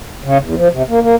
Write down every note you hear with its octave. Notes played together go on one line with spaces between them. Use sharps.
C#3
E2
F3
C3
A#3
A#3